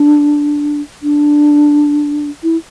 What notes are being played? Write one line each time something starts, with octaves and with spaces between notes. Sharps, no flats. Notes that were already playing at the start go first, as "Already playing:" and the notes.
Already playing: D4
D4
E4